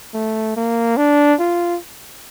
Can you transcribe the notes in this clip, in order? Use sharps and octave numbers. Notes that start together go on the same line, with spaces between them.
A3
A#3
D4
F4